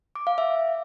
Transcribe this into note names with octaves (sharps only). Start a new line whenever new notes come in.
D6
F5
E5